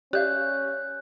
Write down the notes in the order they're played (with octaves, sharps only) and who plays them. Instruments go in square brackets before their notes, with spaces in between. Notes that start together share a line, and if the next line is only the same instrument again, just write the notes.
[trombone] C#4 [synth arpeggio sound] G4 [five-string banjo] D5 E5 F5 [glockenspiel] F#6 G6